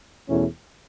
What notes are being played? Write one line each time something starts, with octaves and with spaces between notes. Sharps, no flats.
E2 B2 A3 C#4 E4